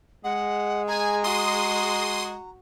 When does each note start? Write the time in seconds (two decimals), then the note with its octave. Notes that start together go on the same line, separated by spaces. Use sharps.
0.24 G#3 F#5
0.88 G#4 G#5 A#5
1.24 F#4 C6 D#6